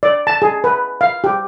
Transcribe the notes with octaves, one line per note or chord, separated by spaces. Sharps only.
D5
A5
G#4
B4
F5
G4